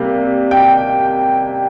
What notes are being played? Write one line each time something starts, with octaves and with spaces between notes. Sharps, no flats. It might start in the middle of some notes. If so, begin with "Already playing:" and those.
Already playing: C3 G3 A#3
G5